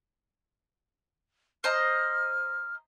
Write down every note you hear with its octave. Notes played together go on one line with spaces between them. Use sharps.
C5 D#5 A#5 F6